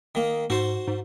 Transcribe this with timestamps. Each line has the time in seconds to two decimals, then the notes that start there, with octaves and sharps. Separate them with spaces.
0.15 D#3 A#3
0.50 G#2 F#4 C5
0.87 G#2